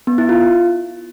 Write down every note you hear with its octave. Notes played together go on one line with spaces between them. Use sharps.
B3
E4
F4